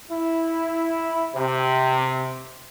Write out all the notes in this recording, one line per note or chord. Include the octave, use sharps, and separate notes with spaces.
E4
C3